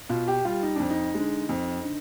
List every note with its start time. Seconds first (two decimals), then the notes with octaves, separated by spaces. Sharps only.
0.09 B2 F4
0.28 G4
0.45 G3 F4
0.63 D#4
0.76 F2 D4
0.90 D#4
1.15 D3 G#3
1.49 F2
1.84 D3